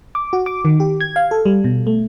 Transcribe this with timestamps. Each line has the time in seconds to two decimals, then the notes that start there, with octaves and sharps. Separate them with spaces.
0.15 D6
0.33 F#4
0.46 D6
0.65 D#3
0.80 G4
1.01 G#6
1.16 F5
1.31 A4
1.46 G3
1.64 B2
1.87 A3